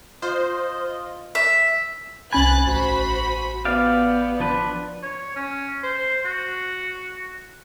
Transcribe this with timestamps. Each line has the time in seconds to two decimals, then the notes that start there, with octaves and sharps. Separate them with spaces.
0.22 F4 C5 D#5
1.35 E5
2.33 C2 C#4 G#5 B5 F#6 A6
2.66 A1 F#4 C5 B5
3.65 B3 G4 D5 F5
4.40 F3 D4 B4
5.02 C#5
5.36 C#4
5.83 C5
6.25 F#4